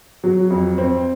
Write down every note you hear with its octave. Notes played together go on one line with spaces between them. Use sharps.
F#3
F2
C4